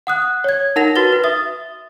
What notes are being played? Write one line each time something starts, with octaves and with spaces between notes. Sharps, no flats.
F#5 D#6 F#6
C#5 G#6
D#4 A#4 F#5 A#6 F7
F#4 B4 A6 G7
B4
E5 D#6 A6